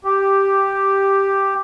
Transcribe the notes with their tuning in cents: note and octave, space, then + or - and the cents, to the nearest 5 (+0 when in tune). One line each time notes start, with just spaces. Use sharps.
G4 +0